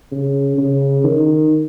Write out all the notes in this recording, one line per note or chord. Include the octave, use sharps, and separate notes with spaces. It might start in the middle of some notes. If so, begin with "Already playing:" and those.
C#3
C#3
D#3